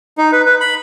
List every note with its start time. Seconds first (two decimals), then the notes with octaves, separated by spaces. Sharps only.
0.18 D#4
0.32 B4
0.46 B4
0.61 B5